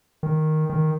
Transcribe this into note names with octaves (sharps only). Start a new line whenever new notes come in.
D#3
D#3